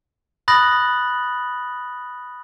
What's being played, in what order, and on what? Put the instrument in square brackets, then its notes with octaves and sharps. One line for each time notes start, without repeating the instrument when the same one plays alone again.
[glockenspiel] B5 D#6 F#6 A6 A#6 F#7